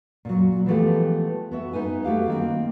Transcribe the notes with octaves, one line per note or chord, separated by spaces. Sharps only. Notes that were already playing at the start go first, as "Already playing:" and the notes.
A#2 F#3
E3 F3 G#3 A3 B3 G4
B3 F#4 E5
B3 D#4 B4 G#5
A3 F#4 G4 F5
D#3 A#3 C4